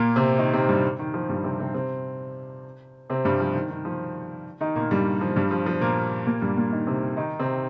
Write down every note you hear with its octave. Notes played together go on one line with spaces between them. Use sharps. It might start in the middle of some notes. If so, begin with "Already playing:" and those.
Already playing: A#2 A#3
C3 C4
D#3 D#4
C3 C4
G2 G3
D#3
F3
G2 G3
C3 C4
C3 C4
C3 C4
C3 C4
G2 G3
F3
D#3
D#3
F3
D#3 D#4
A#2 A#3
G2 G3
F3
G2 G3
F3
F3
A#2 A#3
A#2 A#3
G2 G3
A#2 A#3
D#3 D#4
C3 C4
D#3 D#4
C3 C4